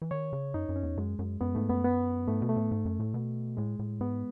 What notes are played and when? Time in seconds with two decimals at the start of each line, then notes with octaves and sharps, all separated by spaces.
0.02 E3
0.11 D#3 C#5
0.33 C#3
0.54 F#2 D#4
0.69 F#2
0.76 C#4
0.83 E2
0.97 F#2 G#3
1.19 F#2
1.41 F#2 B3
1.55 G#2 A3
1.69 F#2 B3
1.84 B3
2.27 G#2 A3
2.42 B2
2.49 A3
2.56 A2
2.71 G#2
2.85 F#2
2.99 A2
3.14 B2
3.57 A2 G#3
3.79 A2
4.01 G#2 B3